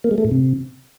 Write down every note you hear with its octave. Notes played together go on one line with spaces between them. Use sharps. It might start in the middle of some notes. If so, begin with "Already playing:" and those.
A#3
G#3
A3
A2
C3